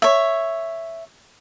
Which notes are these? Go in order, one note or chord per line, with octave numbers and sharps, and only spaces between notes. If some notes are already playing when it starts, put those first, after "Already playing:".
C#5 E5